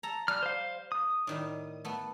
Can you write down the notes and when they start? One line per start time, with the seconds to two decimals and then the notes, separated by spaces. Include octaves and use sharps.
0.03 A4 A#5
0.28 G3 F6
0.43 C5 F5
0.92 D#6
1.27 A2 D#3 G3
1.85 A3 B3